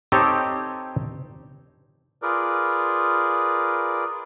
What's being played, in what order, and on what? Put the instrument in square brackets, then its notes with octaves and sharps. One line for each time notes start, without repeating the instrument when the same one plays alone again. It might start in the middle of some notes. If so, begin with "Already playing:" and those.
[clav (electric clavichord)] C4 D#4 G4 A4 C#5
[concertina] F4 G#4 A#4 B4 D5